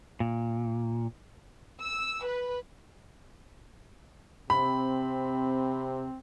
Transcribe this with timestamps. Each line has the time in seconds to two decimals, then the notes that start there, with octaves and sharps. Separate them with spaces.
0.20 A#2
1.81 E6
2.26 B4
4.50 C3 C4 B5